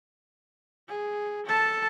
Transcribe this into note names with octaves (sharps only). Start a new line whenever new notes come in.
G#4
A4 A5